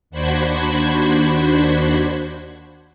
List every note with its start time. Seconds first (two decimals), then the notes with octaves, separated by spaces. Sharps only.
0.10 D#2 D4 F#4 C5 B5 G#6